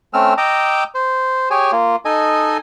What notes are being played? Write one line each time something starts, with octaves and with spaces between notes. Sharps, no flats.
A3 C4 C#4 E6 F6
D#5 G5 A#5 D6 E6
C5
G4 G#4 C#5 G#5
A#3 F4
D#4 A4 D#5 G#5